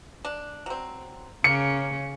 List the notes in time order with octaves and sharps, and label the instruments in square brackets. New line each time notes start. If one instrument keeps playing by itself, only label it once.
[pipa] D4
F#3 C4
[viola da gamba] C#3 C#4 [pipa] A#3 [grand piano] C#7